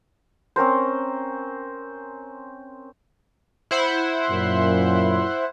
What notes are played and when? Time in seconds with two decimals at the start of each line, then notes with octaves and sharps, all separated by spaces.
0.56 C4 C#4 A#4 C5
3.71 E4 C5 F#5
4.31 F#2 A#2